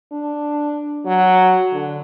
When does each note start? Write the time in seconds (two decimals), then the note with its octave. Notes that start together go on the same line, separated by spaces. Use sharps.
0.12 D4
1.06 F#3
1.73 D3